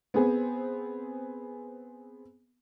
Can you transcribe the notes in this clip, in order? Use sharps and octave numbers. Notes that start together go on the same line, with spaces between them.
B3 C4 G#4